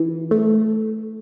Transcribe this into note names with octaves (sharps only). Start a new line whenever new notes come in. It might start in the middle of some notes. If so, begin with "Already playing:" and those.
Already playing: E3
A3